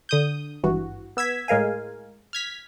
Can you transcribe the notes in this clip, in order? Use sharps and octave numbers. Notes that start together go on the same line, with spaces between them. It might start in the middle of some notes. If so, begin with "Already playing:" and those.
D3 D#6 G6
G#1 G2 E3 F#4
B3 E6 G#6 B6
A2 G#3 A#4 F5 G#5
F6 G#6 B6